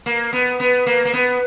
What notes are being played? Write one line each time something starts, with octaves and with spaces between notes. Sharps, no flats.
A#3
B3
B3
A#3
A#3
B3